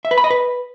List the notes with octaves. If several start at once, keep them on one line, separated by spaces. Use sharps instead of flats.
E5
B4
B5
D#5
B4